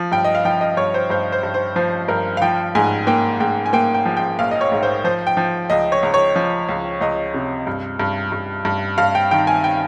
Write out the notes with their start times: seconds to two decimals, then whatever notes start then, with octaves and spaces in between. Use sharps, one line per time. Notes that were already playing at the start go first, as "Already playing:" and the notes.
Already playing: F3
0.12 G2 G5
0.24 D#5
0.35 F5
0.45 F3 G5
0.61 D#5
0.77 G2 C#5
0.94 C5
1.10 G2 C5
1.32 C5
1.43 G2
1.54 C5
1.76 F3 C5
2.08 G2 A#4
2.37 F5
2.42 F3 G5
2.75 G#2 G#5
3.07 A#3 G5
3.40 G#2 G5
3.66 G#5
3.73 A#3 G5
3.94 G5
4.05 F3
4.17 G5
4.39 A#1 F5
4.51 D#5
4.61 C#5
4.72 G#2
4.83 C5
5.04 F3 C5
5.27 G5
5.37 F3
5.70 C#2 D#5
5.92 C#5
6.03 C#2
6.14 C#5
6.36 F3
6.69 C#2
7.01 C#2 D#5
7.34 C3
7.67 G2
8.00 G2
8.32 G2
8.65 G2
8.98 G2 F5
9.15 G5
9.31 D#3 G5
9.47 G#5
9.64 G5